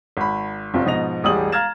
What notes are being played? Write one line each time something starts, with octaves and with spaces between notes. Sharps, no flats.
G#1 B5
G1 C3 G3 C4 F4
G#2 B2 F3 D#5 A#6 F7
E1 A1 G3 G#3 D#6 F#7
F5 A#5 F6 G#6 A6 E7